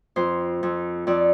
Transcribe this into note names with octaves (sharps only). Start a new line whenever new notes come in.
F2 C5
F2
F2 D5